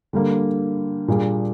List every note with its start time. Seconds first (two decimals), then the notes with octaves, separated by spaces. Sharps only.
0.13 D3 G3 A#3
1.08 A#2 G3 A#3 D4 G#4